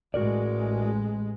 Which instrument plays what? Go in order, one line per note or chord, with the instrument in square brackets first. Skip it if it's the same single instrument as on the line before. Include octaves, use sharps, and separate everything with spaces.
[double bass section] A1 G#3 [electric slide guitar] F#4 A#4 D5